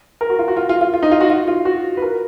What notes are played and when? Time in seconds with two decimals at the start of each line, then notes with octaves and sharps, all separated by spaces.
0.21 A#4
0.30 F#4
0.39 F4
0.48 F#4
0.57 F4
0.69 F4
0.81 F4
0.94 F4
1.02 D#4
1.11 F4
1.21 F#4
1.30 F4
1.48 F4
1.65 F#4
1.97 B4
2.02 A#4